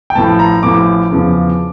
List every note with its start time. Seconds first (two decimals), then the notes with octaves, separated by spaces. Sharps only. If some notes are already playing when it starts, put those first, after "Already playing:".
0.10 G5
0.15 A1 A2 F3 A5
0.39 A#5
0.63 A1 A2 F3 D6
1.11 E2 C#3 F3